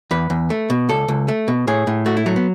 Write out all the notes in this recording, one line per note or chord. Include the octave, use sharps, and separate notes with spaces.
E2 B4
E2
A3
B2
C#2 A4
C#2
A3
B2
A2 G#4
A2
A3 F#4
E4
F#3 A3
B3